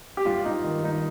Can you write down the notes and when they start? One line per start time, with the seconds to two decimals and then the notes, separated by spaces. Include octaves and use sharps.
0.17 G4
0.25 G2 F4
0.45 G2 D#4
0.64 D#3
0.84 D#3 D#4